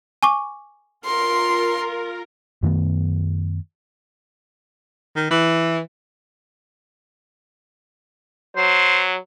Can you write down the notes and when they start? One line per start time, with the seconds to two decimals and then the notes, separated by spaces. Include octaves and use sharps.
0.23 G#5 C#6 D6
1.06 F4 A#4 C6
2.63 F#2 D#3 A3 B3
5.16 D#3
5.31 E3
8.57 F#3 C5